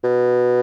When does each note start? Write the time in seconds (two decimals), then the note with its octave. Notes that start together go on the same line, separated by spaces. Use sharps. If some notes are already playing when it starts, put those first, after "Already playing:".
0.04 B2